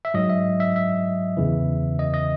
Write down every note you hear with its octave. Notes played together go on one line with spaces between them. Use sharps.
E5
G#2 F#3 D#5
E5
E5
E5
E2 C#3 E3
D#5
D#5